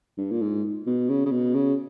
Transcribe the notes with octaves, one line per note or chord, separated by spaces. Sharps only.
G2
A#2
G#2
B2
C#3
C#3
B2
C#3